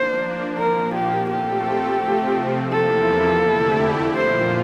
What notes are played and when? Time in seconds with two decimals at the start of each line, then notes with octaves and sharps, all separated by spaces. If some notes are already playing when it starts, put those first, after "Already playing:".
Already playing: F3 A#3 D4 C5
0.58 A#2 F3 A#3 A#4
0.94 G4
1.30 A3 C4 F4 G4 A4
2.00 C3 F3 A3 C4
2.72 E2 C3 F3 A#3 E4 A4
3.44 F2 D3 A3 E4 G4
4.15 A#2 F3 A#3 F4 C5